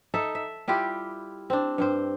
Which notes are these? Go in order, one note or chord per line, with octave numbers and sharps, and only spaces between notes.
D#4 A4 E5
E5
G3 E4 F4 G4
C4 D4
G2 C4 C5